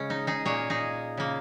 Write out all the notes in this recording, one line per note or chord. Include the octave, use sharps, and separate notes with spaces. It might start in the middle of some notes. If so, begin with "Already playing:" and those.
Already playing: C#3 G#3 C#4
D#4
D#4 G#4
A#2 A#3 G#4 C#5
D#4 G#4
C#3 A#3